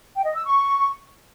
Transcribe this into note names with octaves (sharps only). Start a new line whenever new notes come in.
G5
D#5
E6
C#6